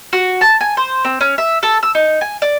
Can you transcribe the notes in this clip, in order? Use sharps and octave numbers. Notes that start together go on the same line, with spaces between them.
F#4
A5
G#5
C5
C4
C#4
E5
A4
E6
D#4
G#5
D5